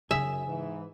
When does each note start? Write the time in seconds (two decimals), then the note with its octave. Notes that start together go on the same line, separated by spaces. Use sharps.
0.11 F#2 C#3 D#4 G#4 E5
0.47 G#2 E3